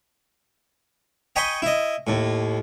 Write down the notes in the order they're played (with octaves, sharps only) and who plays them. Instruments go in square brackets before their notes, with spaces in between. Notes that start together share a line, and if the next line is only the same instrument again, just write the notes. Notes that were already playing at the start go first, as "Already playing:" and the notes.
[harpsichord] D#5 G5 G#5 B5 C#6
E4 D#5
D#2 A2